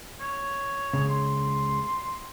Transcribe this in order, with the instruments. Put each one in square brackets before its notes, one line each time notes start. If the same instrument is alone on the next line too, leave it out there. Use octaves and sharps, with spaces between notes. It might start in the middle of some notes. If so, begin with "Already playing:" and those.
[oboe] C#5
[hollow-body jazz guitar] C#2 C#3
[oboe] C6